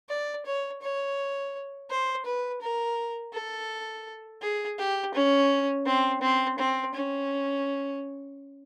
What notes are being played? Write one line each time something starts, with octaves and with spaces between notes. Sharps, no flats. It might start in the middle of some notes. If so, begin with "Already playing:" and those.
D5
C#5
C#5
C5
B4
A#4
A4
G#4
G4
C#4
C4
C4
C4
C#4